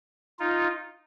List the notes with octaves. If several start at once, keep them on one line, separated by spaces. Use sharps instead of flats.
D#4 F4